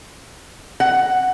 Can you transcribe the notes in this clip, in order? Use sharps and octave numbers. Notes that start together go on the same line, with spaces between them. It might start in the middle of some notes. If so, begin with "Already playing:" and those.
F#5